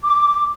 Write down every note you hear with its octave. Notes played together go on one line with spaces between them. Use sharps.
D6